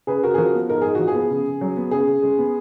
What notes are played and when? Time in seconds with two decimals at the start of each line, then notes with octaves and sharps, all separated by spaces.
0.07 C#3 G#4 B4
0.23 C#3 F#4 A#4
0.34 G#4
0.38 F3 F#4 A#4
0.54 B3
0.69 G#2 A#4
0.81 G#2 G#4
0.95 F3 F#4
1.08 G#4
1.15 B3
1.30 C#3
1.46 C#3
1.61 F#3
1.77 B3
1.91 C#3 G#4
2.07 C#3
2.22 G#3
2.38 B3